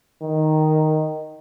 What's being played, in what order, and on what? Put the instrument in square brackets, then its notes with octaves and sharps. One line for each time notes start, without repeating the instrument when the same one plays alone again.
[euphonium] D#3